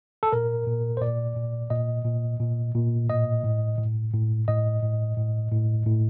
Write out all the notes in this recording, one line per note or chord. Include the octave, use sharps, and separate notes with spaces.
A4
A#2 A#4
A#2
C5
A#2 D5
A#2
A#2 D#5
A#2
A#2
A#2
A2 D#5
A2
A2
A2
A2 D#5
A2
A2
A2
A2